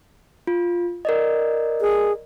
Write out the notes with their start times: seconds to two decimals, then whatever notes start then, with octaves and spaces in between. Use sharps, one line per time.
0.47 F4
1.05 A#4 D5 D#5
1.81 G#4